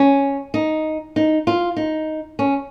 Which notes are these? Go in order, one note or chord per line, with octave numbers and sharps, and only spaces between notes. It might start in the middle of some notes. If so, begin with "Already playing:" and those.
Already playing: C#4
D#4
D#4
F4
D#4
C#4